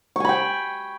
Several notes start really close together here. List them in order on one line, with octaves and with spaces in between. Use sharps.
C#6 G#5 B5 G5